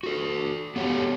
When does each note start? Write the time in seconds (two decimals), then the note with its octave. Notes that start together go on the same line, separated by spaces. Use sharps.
0.03 F#4 A4
0.76 B3 G4 A4 C#5